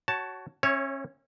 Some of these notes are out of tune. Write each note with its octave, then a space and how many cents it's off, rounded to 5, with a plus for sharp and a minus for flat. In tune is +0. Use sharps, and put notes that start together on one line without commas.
F#4 +20 C#5 +0 A5 +0
C#4 -30 C#5 +0 E5 +0